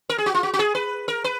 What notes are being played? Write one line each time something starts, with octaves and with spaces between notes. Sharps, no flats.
A#4
G#4
F#4
F4
F#4
F#4
G#4
B4
A#4
B4